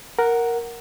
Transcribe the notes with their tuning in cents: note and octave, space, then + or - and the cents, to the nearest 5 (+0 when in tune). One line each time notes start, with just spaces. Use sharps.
A#4 +0 F#5 +0